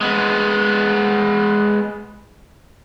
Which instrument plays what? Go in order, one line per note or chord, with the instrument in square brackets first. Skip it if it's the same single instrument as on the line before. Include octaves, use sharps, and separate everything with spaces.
[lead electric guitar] G#3 B3